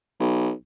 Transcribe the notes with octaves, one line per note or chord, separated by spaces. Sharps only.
B1